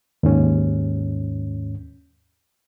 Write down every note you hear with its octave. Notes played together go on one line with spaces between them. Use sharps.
D#2 G#2 C#4